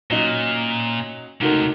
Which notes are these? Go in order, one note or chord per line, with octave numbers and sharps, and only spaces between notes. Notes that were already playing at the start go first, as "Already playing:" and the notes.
A#2 F#3 C#4 D#4
C#2 C3 A3 D#4 F#4 A#4